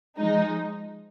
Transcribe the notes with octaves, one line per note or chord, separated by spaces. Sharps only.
F3 G#3 D#4